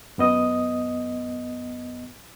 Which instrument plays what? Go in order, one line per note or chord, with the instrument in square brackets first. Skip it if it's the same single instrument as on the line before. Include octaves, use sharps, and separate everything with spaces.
[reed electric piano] F#2 B3 D#5 D#6